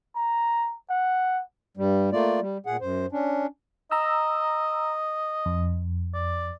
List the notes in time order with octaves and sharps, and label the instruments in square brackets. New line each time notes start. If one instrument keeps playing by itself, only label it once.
[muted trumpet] A#5
F#5
[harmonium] G2 G3
A3 A#3 F4 D5
G3
A#2 G#4 F#5
F#2 C5
C#4 D4
[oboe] D#5 [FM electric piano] A#5 E6
[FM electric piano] F2
[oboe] D5